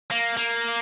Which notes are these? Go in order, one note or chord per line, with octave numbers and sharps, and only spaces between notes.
A#3
A#3